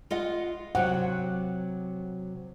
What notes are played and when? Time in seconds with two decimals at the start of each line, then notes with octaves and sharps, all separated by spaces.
0.11 F4 D#5 F#5
0.75 C3 F#3 F#5